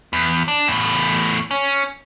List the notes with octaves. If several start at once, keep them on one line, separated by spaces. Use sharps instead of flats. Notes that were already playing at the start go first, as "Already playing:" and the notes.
E2
D4
E2 A2
C#4